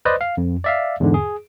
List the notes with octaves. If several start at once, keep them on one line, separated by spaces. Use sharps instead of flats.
B4 C5 D5 D#5
F5
F2
D5 E5 F5
E2 G#2 D3
G#4